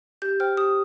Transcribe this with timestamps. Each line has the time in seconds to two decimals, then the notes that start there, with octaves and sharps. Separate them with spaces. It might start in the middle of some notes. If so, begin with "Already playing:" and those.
0.22 G4 G6
0.40 C5 G5 F6
0.57 G4 D#6